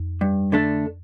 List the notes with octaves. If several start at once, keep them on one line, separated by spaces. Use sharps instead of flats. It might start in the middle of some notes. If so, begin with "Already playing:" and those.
Already playing: F2
G2
D3 A3 D4 A4